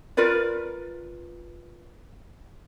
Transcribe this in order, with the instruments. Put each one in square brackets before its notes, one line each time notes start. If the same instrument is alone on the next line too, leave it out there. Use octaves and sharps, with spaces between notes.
[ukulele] F4 A#4 B4 D5